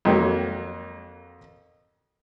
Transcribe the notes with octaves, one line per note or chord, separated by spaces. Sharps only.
F2 D#3 F#3 A#3